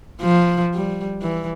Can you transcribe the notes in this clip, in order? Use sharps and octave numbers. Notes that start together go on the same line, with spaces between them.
F3
G3
E3